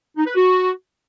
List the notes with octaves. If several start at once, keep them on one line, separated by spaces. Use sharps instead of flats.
D#4
B4
F#4